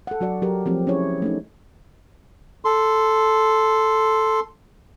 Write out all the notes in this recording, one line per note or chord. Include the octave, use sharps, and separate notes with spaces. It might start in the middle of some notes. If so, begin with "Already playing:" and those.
A4 F#5
F#3 F#4 D5
F#3 G4 A#4
F3 A3 C4 E4 G4
C#4 E4 G#4 C#5
A3 C#4 D#4
A4 C6